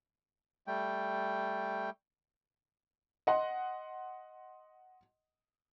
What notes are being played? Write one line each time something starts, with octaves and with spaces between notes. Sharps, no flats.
G3 A3 G5
D#5 F#5 C6